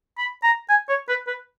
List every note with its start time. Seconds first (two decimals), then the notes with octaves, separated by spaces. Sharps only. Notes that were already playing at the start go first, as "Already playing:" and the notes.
0.18 B5
0.43 A#5
0.69 G#5
0.89 C#5
1.09 B4
1.27 B4